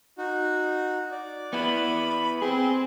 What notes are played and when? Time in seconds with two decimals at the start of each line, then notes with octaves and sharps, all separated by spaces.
0.18 D#4 F#4
1.11 D5
1.53 B3 E4 B5
2.42 C4 G#4 C6